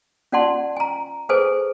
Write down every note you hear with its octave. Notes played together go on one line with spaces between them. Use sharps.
C#4 F4 D5 F#5 A5 C6
G#5 A#5
G#4 A4 B4 C5 G#5